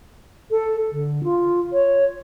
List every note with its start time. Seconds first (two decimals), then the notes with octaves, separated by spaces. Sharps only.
0.51 A4
0.92 D3
1.24 F4
1.73 C#5